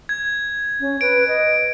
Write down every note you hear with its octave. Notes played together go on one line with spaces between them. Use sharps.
G#6
C#4
B4 D7
D#5